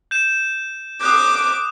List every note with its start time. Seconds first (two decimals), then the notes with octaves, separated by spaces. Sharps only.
0.11 G6 E7
1.01 D6 D#6 F#6 G6